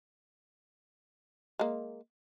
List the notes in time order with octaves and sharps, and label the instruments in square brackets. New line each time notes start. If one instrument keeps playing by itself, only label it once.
[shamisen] G#3 A#3